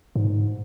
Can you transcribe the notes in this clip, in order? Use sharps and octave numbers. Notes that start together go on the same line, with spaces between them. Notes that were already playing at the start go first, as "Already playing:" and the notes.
G#2